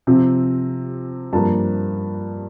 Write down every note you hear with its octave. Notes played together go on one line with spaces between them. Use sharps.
C3 F3 C4
G2 F3 A#3 A5